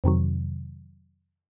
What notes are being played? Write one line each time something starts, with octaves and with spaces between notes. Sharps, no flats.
F2 C3 D#3 F#3